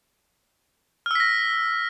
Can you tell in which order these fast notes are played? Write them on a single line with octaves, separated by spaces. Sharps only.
F6 E6 B6 A#6